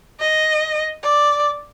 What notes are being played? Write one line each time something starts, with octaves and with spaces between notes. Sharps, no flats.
D#5
D5